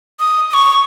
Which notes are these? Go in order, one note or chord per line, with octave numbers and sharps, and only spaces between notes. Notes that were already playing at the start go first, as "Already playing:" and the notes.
D#6
D#6
C#6